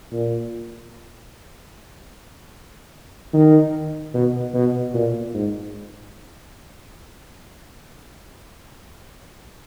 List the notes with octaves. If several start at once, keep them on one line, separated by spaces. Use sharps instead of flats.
A#2
D#3
B2
B2
A#2
G#2